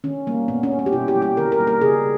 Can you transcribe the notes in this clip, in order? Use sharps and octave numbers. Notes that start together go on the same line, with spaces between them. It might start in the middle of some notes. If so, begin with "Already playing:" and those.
D#3 C#4
G3 A#3
A#2 B3
C#4
G3 A#3
C#4
G4
B2 E4
G4
G3 A#3
G4
D#3 A#4
A#4
G3 A#3
A#4
C#3 G#4